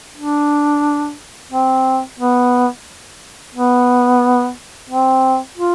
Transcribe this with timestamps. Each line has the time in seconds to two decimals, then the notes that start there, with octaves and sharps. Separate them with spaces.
0.17 D4
1.52 C4
2.20 B3
3.55 B3
4.90 C4
5.57 F4